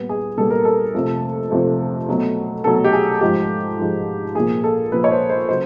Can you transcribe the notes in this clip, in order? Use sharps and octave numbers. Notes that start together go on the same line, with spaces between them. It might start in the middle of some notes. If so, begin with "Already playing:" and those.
Already playing: A#2 G3 B3
G#4
A#2 G3 B3 A4
A#4
A4
F2 C3 F3 A3
F2 C3 F3 A3
B2 F#3 A3
B2 F#3 A3 A4
G4
G#4
G#2 F3 G#3 G4
G#2 F3 G#3
A#2 F3 A#3 G#4
A4
A#2 F3 A#3 B4
C#5
C5
C5
C#3 F#3 C5